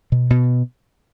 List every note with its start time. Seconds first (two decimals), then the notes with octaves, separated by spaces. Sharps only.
0.12 B2
0.30 B2